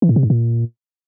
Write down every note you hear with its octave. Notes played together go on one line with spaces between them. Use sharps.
E3
A2
C3
G#2
A#2